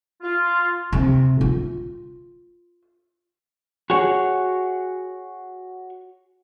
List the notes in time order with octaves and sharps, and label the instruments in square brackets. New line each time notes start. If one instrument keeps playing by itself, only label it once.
[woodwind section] F4
[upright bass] C3
F4
[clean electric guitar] F#4 G#4 C#5